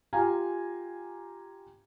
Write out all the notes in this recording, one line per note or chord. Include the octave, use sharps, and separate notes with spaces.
F4 G4 F5 G#5 A#5